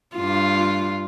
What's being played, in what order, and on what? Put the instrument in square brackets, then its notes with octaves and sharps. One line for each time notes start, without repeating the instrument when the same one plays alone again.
[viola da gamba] G2 F4